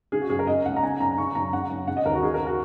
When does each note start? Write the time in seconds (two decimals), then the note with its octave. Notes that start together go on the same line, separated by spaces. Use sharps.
0.12 C#3 G#4
0.21 F#4
0.30 F#2 G#4
0.39 A#4
0.47 C#3 D#5
0.65 C#2 F#5
0.77 A#5
0.83 C#3 G#5
1.00 F#2 A#5
1.18 C#3 C#6
1.35 F#2 A#5
1.53 C#3 F#5
1.70 F#2
1.88 C#3 F#5
1.97 D#5
2.05 D#2 A#4
2.14 F#4
2.22 C#3 G#4
2.34 A#4
2.46 F#4